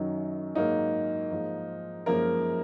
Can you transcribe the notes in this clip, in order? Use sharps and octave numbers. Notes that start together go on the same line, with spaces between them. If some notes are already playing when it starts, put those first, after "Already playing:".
Already playing: F#2 D#3 F#3 D#4
G#2 F#3 A#3 D#4
G#2 F3 A#3
F#2 F3 G#3 A#3 A#4